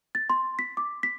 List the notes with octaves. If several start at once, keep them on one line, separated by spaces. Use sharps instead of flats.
A6
C6
B6
D6
B6